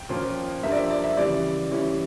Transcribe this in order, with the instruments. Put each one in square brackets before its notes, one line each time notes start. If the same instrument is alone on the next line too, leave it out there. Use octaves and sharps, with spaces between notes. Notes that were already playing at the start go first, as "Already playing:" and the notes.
Already playing: [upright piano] G5
A#2 F3 C#4 F4
G2 F3 A#3 E5
D5
E5
D5
E5
C#3 E3 G3 D5
E3 G3 C#4 E4